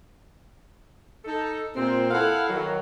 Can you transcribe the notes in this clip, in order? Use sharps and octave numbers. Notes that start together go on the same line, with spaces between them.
D#4 A4
A#2 C4
E4 A4 F5 F#5
D#3 F#3